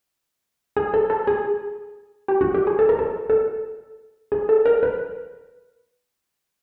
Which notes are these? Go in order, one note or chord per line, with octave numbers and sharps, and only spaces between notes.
G#4
A4
A4
G#4
G4
F#4
G4
G#4
A4
A#4
A4
A4
G#4
A4
A#4
B4